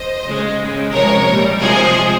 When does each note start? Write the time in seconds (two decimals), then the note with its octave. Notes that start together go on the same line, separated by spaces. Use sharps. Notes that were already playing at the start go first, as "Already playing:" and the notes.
Already playing: C5 D#5
0.25 C#3 G#3
0.59 C#3 G#3
0.93 C3 F3 G#3 A#4 C#5
1.27 A#2 G3
1.61 C3 F3 G#3 G#4 C5